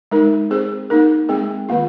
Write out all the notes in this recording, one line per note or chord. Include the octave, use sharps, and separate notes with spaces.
G#3 D#4 A#4
C4 G#4 C5
A#3 D#4 A#4
G#3 C4 G#4
D#3 A#3 F4